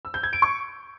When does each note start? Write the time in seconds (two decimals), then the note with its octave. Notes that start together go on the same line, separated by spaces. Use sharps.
0.05 E6
0.14 G6
0.23 G#6
0.33 D7
0.42 C#6